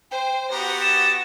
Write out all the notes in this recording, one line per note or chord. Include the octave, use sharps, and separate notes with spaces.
C5 G5
B3 F#4 G4 A#5 A#6
A6 E7